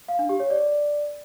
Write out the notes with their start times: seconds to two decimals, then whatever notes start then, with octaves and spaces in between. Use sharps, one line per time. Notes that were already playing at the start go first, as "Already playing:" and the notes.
0.08 F5
0.19 D4
0.29 G4
0.40 C#5
0.50 D5